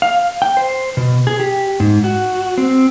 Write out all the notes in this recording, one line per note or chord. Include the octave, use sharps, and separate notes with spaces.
F5
G5
C5
B2
G#4
G4
G#2
F#4
C4